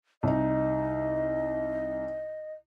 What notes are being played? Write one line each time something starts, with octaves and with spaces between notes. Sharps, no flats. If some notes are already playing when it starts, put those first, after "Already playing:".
C2 D#4 D#5